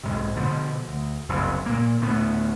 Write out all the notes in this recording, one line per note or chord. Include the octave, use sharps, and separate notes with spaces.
B1 G#2 C3
B2 D3 F3
D2
F#1 C2 F#2
A#2 A#3
D2 A2 A3 B3